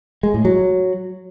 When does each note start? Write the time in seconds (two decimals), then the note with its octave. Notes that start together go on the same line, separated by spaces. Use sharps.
0.23 G#3
0.34 A2
0.45 F#3